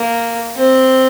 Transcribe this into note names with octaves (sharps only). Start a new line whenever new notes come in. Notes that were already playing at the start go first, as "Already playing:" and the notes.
Already playing: A#3
C4